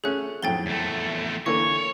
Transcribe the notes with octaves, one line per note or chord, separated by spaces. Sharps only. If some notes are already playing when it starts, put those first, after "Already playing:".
A3 C#4 G#4 F#6
B1 F2 A2 G5 A6 G7
E2 A3
D3 E3 A#3 C#5 C#6